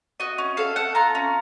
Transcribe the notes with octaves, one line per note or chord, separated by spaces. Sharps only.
F#4 D#5
C#4
A4 F5
A4 F#5
F4 A#5
C#4